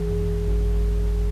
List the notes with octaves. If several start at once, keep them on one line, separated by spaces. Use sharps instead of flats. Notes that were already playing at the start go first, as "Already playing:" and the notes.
Already playing: G#1 E3 G#4
F#2
G#1